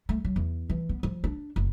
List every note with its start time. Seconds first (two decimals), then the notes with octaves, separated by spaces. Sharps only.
0.09 A3
0.25 F#3
0.36 E2
0.69 E3
0.89 B3
1.03 F3
1.24 D4
1.56 F#1